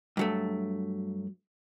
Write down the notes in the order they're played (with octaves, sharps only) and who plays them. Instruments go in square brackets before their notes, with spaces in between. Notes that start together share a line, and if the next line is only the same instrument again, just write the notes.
[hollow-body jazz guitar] G2 F#3 A3